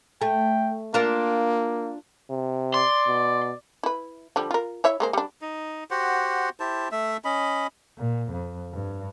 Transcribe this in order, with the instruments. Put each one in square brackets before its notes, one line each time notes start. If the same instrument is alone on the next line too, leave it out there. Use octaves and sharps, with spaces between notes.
[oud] A3 [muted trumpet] G5
[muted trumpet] A#3 [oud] D4 F4 A#4
[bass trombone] C3
[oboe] D5 [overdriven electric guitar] C6
[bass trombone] B2
[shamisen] E4 B4
D3 F3 G3
F4 A#4
E4 C#5 E5
G#3 A#3 C5
G3 D4
[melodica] D#4
F#4 G4 C5 F#5
E4 G4 C5 A5
A3 E5
C#4 D#5 B5
[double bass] A#2
F2
G2